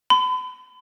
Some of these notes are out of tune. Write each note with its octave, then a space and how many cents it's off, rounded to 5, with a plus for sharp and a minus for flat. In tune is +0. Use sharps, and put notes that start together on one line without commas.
B5 +40